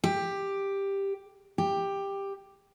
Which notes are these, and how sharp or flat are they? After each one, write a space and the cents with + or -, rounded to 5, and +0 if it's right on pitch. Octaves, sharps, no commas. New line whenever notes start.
G4 +10
G4 +10